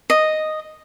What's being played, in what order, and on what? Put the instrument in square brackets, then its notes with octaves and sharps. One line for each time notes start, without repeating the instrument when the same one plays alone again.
[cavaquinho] D#5